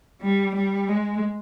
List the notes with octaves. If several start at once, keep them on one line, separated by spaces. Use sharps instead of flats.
G3
G3
G#3